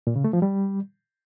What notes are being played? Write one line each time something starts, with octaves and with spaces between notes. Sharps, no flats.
A#2
C#3
A3
F3
G3